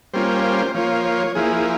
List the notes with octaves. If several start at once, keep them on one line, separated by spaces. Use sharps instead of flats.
G3 A#3 C#4 F4 C5
C5
F3 A#3 F4 C#5
C#5
F3 A#3 E4 G#4
G#4